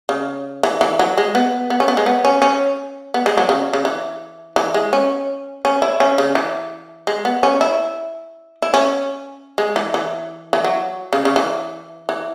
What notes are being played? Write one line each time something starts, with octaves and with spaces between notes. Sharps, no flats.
C#3
E3
E3
F#3
G#3
B3
B3
C#4
B3
G#3
B3
C#4
C#4
B3
G#3
F#3
C#3
C#3
E3
E3
G#3
C#4
C#4
E4
C#4
C#3
E3
G#3
B3
C#4
E4
E4
C#4
G#3
E3
E3
E3
F#3
C#3
C#3
E3
E3